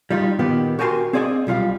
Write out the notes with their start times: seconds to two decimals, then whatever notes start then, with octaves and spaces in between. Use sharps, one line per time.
0.11 G3 D#4 F4
0.39 A#2 D#3 B3 G4
0.79 F#4 G4 A#4 G#5 A5 C6
1.13 C4 G#4 D5 D#5 F5 G#5
1.47 B1 G3 F4 F5